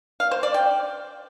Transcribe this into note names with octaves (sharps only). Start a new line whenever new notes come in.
F5
C5
D5
G5